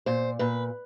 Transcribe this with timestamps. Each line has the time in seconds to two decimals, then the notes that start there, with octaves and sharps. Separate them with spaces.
0.06 A#2 C5
0.39 A#2 B4